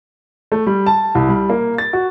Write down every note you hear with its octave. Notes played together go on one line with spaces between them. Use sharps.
A3
G3
A5
C2
G3
A#3
A6
F#4